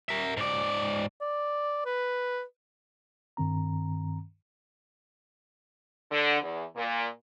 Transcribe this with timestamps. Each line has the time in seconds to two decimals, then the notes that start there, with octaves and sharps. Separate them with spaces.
0.09 A#4 E5
0.37 G#2 D5
1.21 D5
1.85 B4
3.37 G2 D#3 C4 A#5
6.11 D3
6.41 E2
6.76 A#2